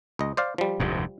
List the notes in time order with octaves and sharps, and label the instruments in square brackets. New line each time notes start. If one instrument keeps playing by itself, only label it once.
[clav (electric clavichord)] C#2 D#5
C5 D5 F5
F3 G3
[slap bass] F1 D2 G#2